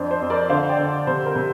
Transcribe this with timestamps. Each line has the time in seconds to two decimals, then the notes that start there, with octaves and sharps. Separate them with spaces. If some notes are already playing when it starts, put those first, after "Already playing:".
Already playing: F2 D4 C5
0.11 C5
0.21 F2
0.30 A#4 D5
0.50 D3 C5 F5
0.69 D5 G5
0.79 D3
1.07 C3 C5
1.26 A#4
1.36 C3